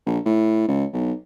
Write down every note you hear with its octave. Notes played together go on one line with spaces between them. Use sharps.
A#1
A2
C#2
B1